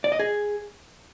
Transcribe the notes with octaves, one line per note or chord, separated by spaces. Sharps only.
D5
D#5
G#4